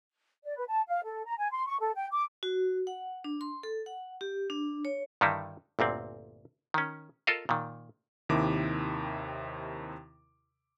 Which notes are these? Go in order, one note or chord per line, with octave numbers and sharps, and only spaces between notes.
D5
B4
A5
F5
A4
A#5
G#5
C6
C#6
A4
G5
D6
F#4
F#5
D4
C6
A4
F#5
G4
D4
C#5
G2 D3 D#3 G3 D#4 E4
G1 D2 A#2 C4
D#3 C#4
F4 A4 A#4 D#5 F5
A#2 D#3
D#2 C3 D#3 E4 D6